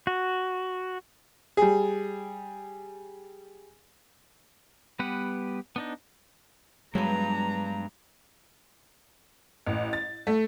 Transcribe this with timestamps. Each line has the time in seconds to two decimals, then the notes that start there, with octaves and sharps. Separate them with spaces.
0.07 F#4
1.57 G3 G#4
4.99 G3 B3 G4 B4 F#5
5.76 B3 D4 D#4
6.95 G2 F#3 G#3 B3 A#5
9.67 A1
9.93 A6
10.27 A3